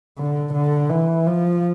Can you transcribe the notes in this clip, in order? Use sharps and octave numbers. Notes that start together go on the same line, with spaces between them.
D3
D3
E3
F3